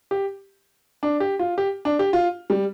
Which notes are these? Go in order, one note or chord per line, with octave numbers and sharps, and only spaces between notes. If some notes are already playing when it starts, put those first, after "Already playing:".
G4
D4
G4
F4
G4
D4
G4
F4
G3